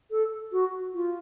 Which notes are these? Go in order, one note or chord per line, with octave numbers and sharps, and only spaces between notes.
A4
F#4
F4